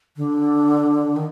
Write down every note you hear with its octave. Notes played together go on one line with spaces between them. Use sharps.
D3
D#3